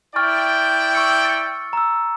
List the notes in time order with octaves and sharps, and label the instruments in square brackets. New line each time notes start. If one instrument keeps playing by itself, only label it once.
[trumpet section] E4 D5 G5 [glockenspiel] C#6 F6 A6
[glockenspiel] C#6 E6 C#7
A6 C#7
A#5 E6